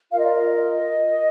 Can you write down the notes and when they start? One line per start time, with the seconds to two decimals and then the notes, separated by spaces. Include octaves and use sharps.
0.11 F4 A#4 F5
0.18 D#5
0.26 D5
0.33 D#5